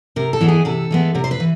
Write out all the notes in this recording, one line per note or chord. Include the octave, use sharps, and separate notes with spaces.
C3 A#4
A4
E3 G#3 B3
G#4
C3 A4
E3 G#3 B3
C3 A#4
C5
B4
E3